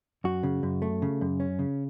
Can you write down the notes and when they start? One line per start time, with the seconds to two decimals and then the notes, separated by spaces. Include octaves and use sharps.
0.24 F#2 F#4
0.43 C#3
0.63 F#2
0.82 A3
1.02 C#3
1.21 F#2
1.40 C#4
1.59 C#3